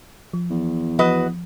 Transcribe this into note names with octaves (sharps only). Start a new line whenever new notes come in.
F3
E2
F3 F#4 B4 D#5